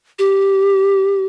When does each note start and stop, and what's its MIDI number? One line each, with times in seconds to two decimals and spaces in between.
0.19 1.26 67